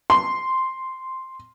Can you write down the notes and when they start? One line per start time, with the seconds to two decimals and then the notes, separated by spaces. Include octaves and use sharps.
0.10 C6